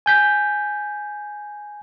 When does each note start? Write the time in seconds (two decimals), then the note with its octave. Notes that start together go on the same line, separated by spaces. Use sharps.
0.06 G#5 G6 B6